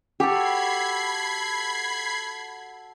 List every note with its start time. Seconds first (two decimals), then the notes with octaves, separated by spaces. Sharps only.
0.20 F#4 G4 A4 B5 G#6 C7